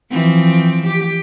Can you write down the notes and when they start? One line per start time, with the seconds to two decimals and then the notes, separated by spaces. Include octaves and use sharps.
0.10 E3 F3 C4
0.86 G4